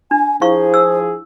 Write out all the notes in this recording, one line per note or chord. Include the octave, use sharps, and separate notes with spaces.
D4 G#5
F3 E4 G#4 C5 F5 C#6
E6